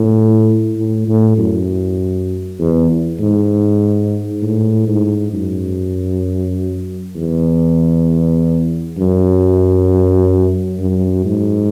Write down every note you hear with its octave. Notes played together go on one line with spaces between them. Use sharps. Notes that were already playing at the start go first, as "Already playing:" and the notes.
Already playing: A2
A2
A2
F#2
E2
G#2
A2
G#2
F#2
E2
F#2
F#2
G#2